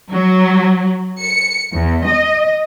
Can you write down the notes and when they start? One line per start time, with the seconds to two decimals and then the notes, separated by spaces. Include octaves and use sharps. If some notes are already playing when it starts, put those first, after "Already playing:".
0.12 F#3
1.22 C#7
1.72 E2
2.07 D#5